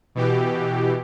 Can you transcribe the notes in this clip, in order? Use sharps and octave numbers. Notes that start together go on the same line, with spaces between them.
B2 E3 G4